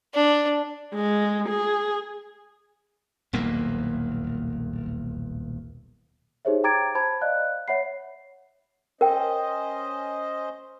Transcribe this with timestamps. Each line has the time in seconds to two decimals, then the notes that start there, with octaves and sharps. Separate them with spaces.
0.14 D4
0.94 G#3
1.49 G#4
3.33 D#1 B1 E2 A#3
6.45 D#4 G4 G#4 C5 C#5 E5
6.64 G5 A#5 D6 G#6 A6 D7
6.95 C5 A5 B5 G#6
7.21 D5 D#5 F5 F#6
7.68 C#5 E5 F#5 B5 C7
9.01 C#4 A#4 C5 D#5 G5